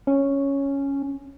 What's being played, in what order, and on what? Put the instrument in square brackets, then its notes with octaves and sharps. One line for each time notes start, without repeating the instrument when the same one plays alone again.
[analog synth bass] C#4